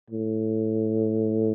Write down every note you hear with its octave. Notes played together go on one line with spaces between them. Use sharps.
A2